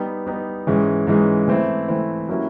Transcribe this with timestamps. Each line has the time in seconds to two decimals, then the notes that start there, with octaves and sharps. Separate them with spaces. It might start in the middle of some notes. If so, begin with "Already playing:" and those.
Already playing: G3 B3 D#4
0.26 G3 B3 D#4
0.67 G#2 E3 G#3 C#4
1.07 G#2 E3 G#3 C#4
1.48 E3 A3 C4 E4
1.88 E3 A3 C4 E4
2.28 F#3 A#3 C#4 E4 G4